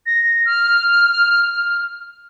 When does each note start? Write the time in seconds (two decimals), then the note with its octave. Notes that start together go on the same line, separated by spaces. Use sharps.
0.06 A#6
0.46 F6